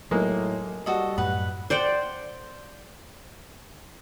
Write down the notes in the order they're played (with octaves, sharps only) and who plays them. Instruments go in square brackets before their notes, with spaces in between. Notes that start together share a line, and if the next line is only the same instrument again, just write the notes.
[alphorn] A2 [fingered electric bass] F#3 [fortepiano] G#3 A#3 D#4
[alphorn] G3 [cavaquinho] F#4 A4 D#5
[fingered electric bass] F#2 A2 [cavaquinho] B4 F#5
[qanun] C5 D5 F#5 G5